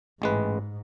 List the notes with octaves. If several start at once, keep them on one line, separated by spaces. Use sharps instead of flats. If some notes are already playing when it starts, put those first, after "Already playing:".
A1 G#2 G#3 B4